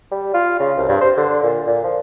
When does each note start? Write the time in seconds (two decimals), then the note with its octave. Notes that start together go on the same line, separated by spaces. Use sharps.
0.11 G3
0.34 F4
0.59 C#3
0.76 C2
0.89 G2
1.01 C5
1.17 D3
1.43 A#2
1.67 A#2
1.83 F3